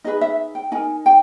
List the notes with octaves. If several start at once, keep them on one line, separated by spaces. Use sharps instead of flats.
D#4 G#4 B4 D#5
E5
G5
D#4 A#4 G#5
G5